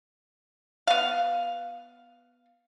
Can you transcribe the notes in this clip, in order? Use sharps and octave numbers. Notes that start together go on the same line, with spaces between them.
B3 F5